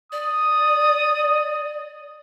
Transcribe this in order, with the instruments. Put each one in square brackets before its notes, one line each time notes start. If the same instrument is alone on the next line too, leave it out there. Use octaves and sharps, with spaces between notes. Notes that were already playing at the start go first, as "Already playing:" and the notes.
[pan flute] D5 [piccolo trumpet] D#6